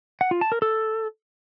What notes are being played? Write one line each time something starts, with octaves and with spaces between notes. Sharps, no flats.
F#5
F4
A5
A#4
A4